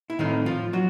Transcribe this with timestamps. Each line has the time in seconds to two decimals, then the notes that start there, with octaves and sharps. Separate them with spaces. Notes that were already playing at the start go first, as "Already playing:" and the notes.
0.10 E4
0.19 A2 D#3 E3 A3 C4 D#4
0.46 F3 F4
0.73 F#3 F#4